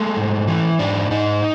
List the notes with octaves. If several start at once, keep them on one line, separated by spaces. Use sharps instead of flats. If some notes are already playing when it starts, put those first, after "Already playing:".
Already playing: G#3 A3
G#2
E3
G#2 D4
G#2 D#4